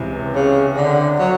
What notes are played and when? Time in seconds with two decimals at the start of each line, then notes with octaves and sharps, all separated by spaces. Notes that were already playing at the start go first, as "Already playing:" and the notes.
Already playing: C#2 C3 E3
0.35 C#3
0.77 D3
1.19 F#3